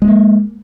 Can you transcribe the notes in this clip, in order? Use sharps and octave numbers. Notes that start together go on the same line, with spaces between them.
G#3 A#3 B3